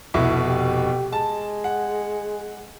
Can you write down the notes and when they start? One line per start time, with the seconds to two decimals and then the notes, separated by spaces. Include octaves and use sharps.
0.14 F1 B2 E4
0.47 G4
1.13 G#3 A5
1.64 F#5